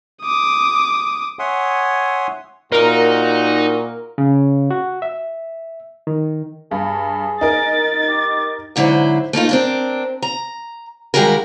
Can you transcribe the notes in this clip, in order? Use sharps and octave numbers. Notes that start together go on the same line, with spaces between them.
D6 D#6
C#5 E5 F#5 G#5 C6 D#6
A#2 D#4 F#4 A#4
C#3
F#4
E5
D#3
G2 G#4
D#4 A#4 A6
G4
G#2 D3 F#3 E4 C5
A3 A#3 D#4 F4
C4 D4 A#4
A#5
D#3 G3 G#3 F4 F#4 A#4